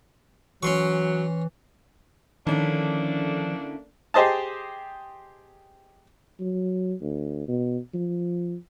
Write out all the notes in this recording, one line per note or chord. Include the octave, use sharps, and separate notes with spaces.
E3 F#3 C#4 C6 C#6
D3 D#3 F3 A3 A#3 C#4 D4 E4
G4 G#4 C5 D#5 A5
F#3
D2
B2
F3